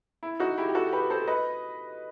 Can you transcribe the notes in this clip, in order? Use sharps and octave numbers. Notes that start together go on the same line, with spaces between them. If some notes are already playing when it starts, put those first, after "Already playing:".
E4
D#4 F#4
E4 G4
G4
F#4 A4
G4 B4
A4 C5
B4 D#5